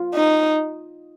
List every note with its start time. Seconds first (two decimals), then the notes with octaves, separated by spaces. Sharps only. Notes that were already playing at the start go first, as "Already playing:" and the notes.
Already playing: F4
0.15 D#4